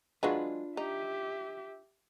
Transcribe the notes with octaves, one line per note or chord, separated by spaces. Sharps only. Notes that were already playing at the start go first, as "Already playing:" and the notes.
F#3 G#3 D4 F4 B4
D#4 G4 E5